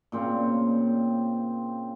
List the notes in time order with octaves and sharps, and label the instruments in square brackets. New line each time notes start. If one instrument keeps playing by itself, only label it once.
[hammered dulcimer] A#2 C#3 C4